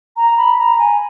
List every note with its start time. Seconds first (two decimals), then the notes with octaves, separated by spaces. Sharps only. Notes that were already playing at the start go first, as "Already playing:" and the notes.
0.17 A#5
0.38 B5
0.58 A#5
0.79 G#5